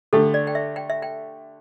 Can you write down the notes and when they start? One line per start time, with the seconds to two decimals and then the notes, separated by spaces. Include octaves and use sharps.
0.13 D3 A3 G4 A4
0.34 D5
0.47 G5
0.55 E5
0.76 G5
0.90 E5
1.02 G5